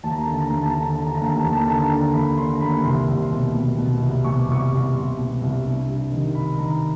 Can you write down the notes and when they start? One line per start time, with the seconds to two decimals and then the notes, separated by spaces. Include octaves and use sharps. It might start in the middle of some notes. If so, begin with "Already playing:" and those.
0.04 D#2 A5
0.11 A#5
0.18 A5
0.26 D3 A#5
0.34 A5
0.40 A#5
0.48 D#2 A5
0.55 A#5
0.63 A5
0.70 A#5
0.74 D3 A5
0.86 A#5
0.93 A5
0.97 D3 A#5
1.08 A5
1.15 A#5
1.21 D#2 A5
1.30 A#5
1.37 A5
1.44 D#2 A#5
1.53 A5
1.60 A#5
1.67 D3 A5
1.75 A#5
1.82 A5
1.90 D3 A#5
1.97 A5
2.14 D#2 B5
2.38 D3 C6
2.55 A#5
2.61 D#2 B5
2.84 C2 C6
3.08 C2
3.19 C6
3.32 B2
3.55 B2
3.78 B2
4.01 C2
4.25 B2 C#6
4.38 D6
4.48 C2 C#6
4.72 C2
4.95 C2 C6
5.18 B2
5.41 C2
5.65 G2
5.89 G2
6.12 D#3
6.35 G2 B5
6.58 D#3 A#5